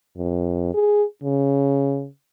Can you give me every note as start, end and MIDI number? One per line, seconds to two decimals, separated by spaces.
0.17 0.70 41
0.74 1.04 68
1.23 2.07 49